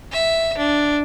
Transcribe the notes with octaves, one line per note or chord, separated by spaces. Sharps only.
E5
D4